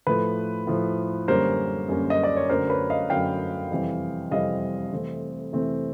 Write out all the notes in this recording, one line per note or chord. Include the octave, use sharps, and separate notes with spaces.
A2 F3 A3 B4
A2 F3 A3
F#2 D3 G3 A#3 C#4 A#4 C5
F#2 D3 G3 A#3 C#4
D#5
D5
C#5
F#2 D3 F#3 A3 A#4 C5
B4 C#5
D#5 F5
F#2 D3 F#3 A3 F5 G5
F2 C3 E3 G3 C4
F2 C3 E3 G3 C4 D#5 F5
C3 E3 A3 C4
C3 E3 A3 C4